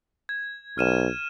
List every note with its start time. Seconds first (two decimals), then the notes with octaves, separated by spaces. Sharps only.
0.29 G#6
0.78 B1 F6 D#7 E7